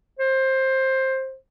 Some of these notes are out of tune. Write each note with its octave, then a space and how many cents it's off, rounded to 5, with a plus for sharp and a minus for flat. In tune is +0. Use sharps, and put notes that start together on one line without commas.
C5 +15